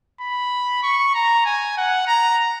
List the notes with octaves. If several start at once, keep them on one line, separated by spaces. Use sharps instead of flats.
B5
C#6
A#5
G#5
F#5
A#5